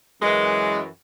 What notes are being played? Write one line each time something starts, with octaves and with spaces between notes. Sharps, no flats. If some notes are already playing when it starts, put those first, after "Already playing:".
F#2 E3 G#3